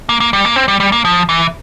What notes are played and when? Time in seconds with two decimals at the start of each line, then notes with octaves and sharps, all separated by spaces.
0.09 A#3
0.20 A#3
0.33 G3
0.45 A#3
0.56 C4
0.68 G3
0.80 G3
0.92 A#3
1.05 F3
1.29 E3